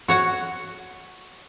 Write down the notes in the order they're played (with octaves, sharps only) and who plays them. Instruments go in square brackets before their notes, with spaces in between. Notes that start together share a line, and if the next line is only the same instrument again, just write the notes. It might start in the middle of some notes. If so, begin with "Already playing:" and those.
[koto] F#4 C#5 F#5